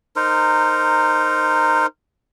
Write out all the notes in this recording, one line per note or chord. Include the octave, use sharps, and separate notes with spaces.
D#4 A#4 C5